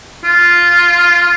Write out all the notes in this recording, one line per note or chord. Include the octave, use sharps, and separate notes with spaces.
F4